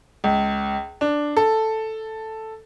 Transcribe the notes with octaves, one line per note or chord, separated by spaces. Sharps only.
C#2
D4
A4